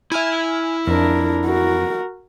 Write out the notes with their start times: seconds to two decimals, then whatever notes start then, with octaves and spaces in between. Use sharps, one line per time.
0.12 E4 E5 G#5 F6
0.87 F2 D4 A#4
1.45 F#4 A#4